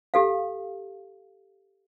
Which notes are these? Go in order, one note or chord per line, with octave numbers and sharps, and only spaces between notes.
G4 A4 F5